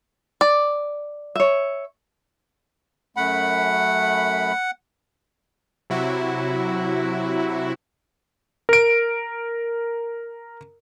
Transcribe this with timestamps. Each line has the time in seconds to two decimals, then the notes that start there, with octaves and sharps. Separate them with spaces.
0.41 D5
1.35 C#5 E5
3.17 F#2 A3 F#5 B5
5.90 C3 F#3 E4 F#4
8.69 A#4 D7